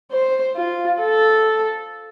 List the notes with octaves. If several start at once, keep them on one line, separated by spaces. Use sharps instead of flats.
C5
F4
A4